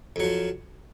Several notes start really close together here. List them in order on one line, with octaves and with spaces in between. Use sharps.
F2 F#3 F3